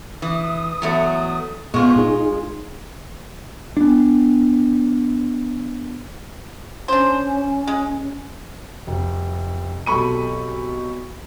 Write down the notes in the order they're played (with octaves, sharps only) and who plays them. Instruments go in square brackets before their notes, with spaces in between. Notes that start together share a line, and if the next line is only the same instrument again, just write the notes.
[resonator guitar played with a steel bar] E3 [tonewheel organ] D#6
[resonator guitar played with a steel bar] E2 F#3 A3
[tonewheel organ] A#2 B3 C#6 [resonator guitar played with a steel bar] G#3 F4
[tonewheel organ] D#4 G#4
[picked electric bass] B3 D4
[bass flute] C#4 [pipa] D4 C5
[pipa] G#3
[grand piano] F1
B1 C3 A4 B5 C#6 D#7